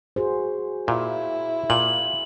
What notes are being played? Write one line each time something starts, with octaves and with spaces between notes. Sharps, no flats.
F#4 G#4 C5
A#2 E4
A#2 F#7